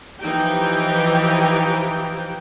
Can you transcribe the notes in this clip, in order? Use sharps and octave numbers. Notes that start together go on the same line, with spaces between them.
E3 F3 D#4 G4 G5